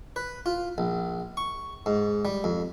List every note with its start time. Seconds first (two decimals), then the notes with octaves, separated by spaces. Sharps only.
0.16 B4
0.46 F4
0.78 A#1
1.37 C#6
1.86 G#2
2.25 G3
2.44 F2